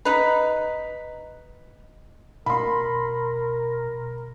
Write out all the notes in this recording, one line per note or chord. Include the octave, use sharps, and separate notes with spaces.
D#4 B4
B2 A#4 B5 C6